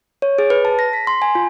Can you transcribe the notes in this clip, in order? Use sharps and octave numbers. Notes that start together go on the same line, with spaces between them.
C#5
G#4
B4
A5
A#6
B6
C6
G#5
F4